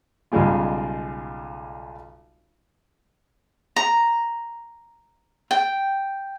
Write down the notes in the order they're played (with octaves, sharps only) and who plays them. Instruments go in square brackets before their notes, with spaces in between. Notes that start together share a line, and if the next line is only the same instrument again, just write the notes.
[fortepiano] B1 C#3 G3 G#3 F4
[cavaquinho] A#5
G5